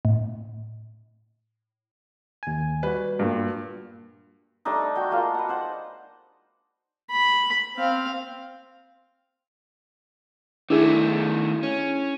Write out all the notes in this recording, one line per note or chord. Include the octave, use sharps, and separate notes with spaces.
A2
D#2 G#5
G3 F#4 B4
G2 A#2
G3 A3 D4 D#4
F#4 G5
G#3 A#3 F4
B4 F#5
C5 F#5
B5
C4 F5
D#3 A3 D4 E4 G#4
C#4